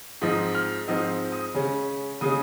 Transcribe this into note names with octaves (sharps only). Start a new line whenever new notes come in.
G#2 F3 C4 D#4 D#6
F6
G#2 F3 C4 D#4 D#6
D#6
C#3 G#3 C#4
C#3 G#3 C#4 D#6